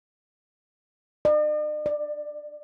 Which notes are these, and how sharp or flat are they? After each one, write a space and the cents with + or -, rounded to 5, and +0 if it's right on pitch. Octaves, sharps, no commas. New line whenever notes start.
D5 +45
D5 +15